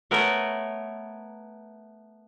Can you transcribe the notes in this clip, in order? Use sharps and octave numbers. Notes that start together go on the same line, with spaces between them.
A3 B3 A#4 B4 C#5